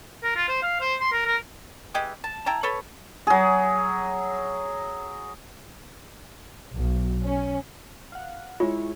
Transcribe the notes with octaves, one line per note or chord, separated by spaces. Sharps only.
A#4
F4
C5
F5
C5
C6
A#4
A#4
E3 G#3 G4 D#5
A5
E4 G5 A5 A#5
A4 B4 C#5
F#3 G#4
B1
C#4
F5 F#5
G#3 E4 F4 C#5